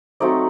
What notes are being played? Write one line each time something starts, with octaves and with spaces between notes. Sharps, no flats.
F#3 A3 C4 D#4 D5